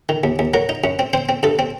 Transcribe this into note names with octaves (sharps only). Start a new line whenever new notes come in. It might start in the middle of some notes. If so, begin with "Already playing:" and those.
D#3
D#2
D#2
F#3 A#4
D#4
F#2
C4
C4 C5
C4
G2 A4
C4